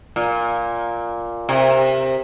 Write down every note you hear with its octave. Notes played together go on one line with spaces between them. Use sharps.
A#2
C3